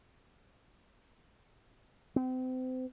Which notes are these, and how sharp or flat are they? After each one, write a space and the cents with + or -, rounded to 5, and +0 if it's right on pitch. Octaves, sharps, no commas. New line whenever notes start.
C4 -35